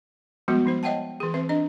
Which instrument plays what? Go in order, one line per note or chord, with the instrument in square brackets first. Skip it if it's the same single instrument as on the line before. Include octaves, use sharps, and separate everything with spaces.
[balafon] F3 G3 G#3 B3 F#4
F3 D#4 C5
C#5 D#5 E5 F#5 G5 A5
E3 G#4
E3 C4 C5 E5
D4 D#5